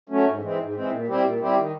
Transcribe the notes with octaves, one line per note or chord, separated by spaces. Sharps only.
F#3 A3 C#4
G#2
E3 G#3 C4
G#2
E3 G#3 C4
A#2
G3 C4 E4 G4
A#2
G3 C4 E4 G4
D#3